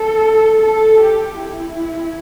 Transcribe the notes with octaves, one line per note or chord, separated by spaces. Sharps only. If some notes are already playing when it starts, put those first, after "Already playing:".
Already playing: A4
A4
G4
E4